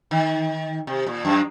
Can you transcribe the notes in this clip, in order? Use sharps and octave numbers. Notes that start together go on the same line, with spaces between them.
D#3
C3
A#2
F#2